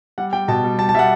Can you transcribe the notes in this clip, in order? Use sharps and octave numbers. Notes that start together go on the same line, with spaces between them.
G3 F#5
G3 G5
B2 A5
G3
G3 A5
A5
G3 E5 F#5